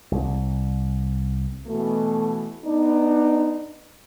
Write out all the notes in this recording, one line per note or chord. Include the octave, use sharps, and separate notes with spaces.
C2
B2 E3 A3
B3 D4 D#4